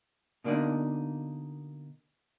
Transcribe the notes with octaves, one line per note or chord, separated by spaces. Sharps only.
B2 D3 A#3 C4 D4 D#4